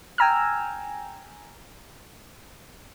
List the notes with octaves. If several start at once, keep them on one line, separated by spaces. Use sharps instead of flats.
G5 G#5 A#5 E6 F6